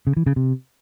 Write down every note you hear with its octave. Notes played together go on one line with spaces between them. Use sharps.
C#3
E3
C#3
C3